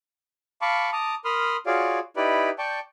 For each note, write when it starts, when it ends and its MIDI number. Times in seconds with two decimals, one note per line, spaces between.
0.62 0.90 77
0.62 0.90 81
0.62 0.90 83
0.62 0.90 85
0.62 0.90 86
0.93 1.15 81
0.93 1.15 82
0.93 1.15 86
0.93 1.15 87
1.25 1.57 70
1.25 1.57 83
1.25 1.57 84
1.25 1.57 87
1.25 1.57 89
1.66 1.99 65
1.66 1.99 66
1.66 1.99 68
1.66 1.99 73
1.66 1.99 74
1.66 1.99 77
2.17 2.50 63
2.17 2.50 64
2.17 2.50 67
2.17 2.50 71
2.17 2.50 74
2.17 2.50 83
2.58 2.80 74
2.58 2.80 79
2.58 2.80 81
2.58 2.80 85
2.58 2.80 91